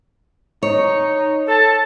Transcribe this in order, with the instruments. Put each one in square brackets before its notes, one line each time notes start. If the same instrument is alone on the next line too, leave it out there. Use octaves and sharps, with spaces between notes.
[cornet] D#4 [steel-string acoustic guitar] C#5
[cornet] A4 [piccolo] A5